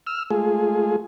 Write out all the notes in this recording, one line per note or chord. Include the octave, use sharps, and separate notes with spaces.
E6 F6
G#3 A3 F4 G#4